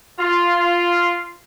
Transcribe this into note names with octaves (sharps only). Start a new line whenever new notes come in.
F4